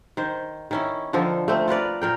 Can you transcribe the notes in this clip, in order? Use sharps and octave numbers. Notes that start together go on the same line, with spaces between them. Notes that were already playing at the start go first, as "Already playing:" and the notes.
D#3 C5
D#3 C#4 E4
D3 D#3 F3 A4
A3 A#3 C4
F4 A#4 B4 D5
A#2 A#4 G5